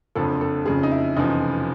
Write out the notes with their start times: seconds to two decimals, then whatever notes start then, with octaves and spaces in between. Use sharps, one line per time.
0.15 F#1 F2 D3 F3 A4
0.41 A4
0.66 F#1 F2 C#3 G#4
0.83 D#4
0.91 E4
1.16 F1 E2 C#3 F3 D#4